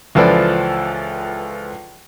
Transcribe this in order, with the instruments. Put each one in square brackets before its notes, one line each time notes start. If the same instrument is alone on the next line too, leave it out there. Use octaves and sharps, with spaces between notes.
[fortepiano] C#2 E3 F3 A4 B4 D5